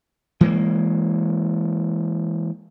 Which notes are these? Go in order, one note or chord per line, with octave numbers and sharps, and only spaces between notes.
E3 G#3 A#3